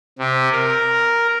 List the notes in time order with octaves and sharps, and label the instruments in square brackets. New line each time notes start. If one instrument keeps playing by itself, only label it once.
[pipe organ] C3
A#4